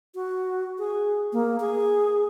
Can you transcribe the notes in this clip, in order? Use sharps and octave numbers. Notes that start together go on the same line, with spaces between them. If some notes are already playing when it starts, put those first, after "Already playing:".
F#4
G#4
A#3
G#4